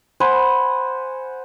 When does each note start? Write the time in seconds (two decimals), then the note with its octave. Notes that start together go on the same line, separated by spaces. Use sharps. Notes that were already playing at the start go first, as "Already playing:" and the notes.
0.20 C5 F#5 G#5 B5